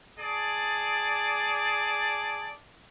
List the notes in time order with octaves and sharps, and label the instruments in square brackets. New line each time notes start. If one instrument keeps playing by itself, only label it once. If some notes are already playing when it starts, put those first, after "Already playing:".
[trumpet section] G#4 D5 A5